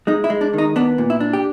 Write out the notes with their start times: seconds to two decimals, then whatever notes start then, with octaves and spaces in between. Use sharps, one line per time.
0.07 G#3 D#4
0.24 E4
0.30 G#3
0.41 D4
0.53 D#3
0.58 D#4
0.76 B3 D4
0.98 A#2
1.10 E4
1.20 D4
1.33 G4